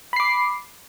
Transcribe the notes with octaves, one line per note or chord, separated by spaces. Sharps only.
B5 D6 C7